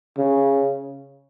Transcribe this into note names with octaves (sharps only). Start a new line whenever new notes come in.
C#3